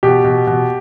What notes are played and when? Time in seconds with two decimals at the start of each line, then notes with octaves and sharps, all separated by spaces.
0.03 B2 G4
0.24 B2
0.47 B2